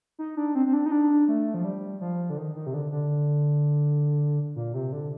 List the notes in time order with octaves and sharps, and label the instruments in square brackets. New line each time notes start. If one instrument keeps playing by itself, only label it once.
[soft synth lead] D#4
D4
C4
C4
D4
D#4
D4
A3
F3
G3
F3
D3
D#3
D#3
C3
D3
D3
A#2
C3
D3